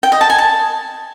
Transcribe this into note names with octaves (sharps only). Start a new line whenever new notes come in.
G5
D#5
A5
G#5
A5